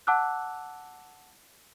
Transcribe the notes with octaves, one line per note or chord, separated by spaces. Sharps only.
F#5 A5 D6 E6 F#6